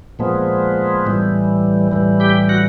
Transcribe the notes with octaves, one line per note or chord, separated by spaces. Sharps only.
A#2 F3 G#3 B3
A2 E3 G3
A2 E3 G3
G4 G5
F#4 F#5